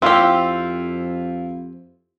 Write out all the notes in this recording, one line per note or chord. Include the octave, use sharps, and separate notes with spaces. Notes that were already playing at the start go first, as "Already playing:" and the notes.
F2 C4 E4 F4 G4 F5